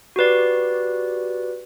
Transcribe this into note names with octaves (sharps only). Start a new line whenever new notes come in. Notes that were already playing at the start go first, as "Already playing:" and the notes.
F#4 G4 B4 D5